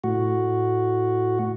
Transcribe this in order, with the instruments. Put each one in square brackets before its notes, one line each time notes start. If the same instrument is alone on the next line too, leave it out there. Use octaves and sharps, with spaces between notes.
[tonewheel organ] A2 F#4